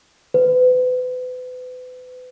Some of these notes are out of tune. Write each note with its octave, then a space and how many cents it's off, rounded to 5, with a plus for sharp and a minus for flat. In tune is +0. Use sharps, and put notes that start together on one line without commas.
B4 +35